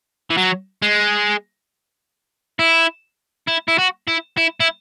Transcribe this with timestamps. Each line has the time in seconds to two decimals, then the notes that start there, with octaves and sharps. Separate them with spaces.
0.31 E3
0.38 F#3
0.82 G#3
2.59 E4
3.48 E4
3.68 E4
3.78 F#4
4.08 E4
4.37 E4
4.60 E4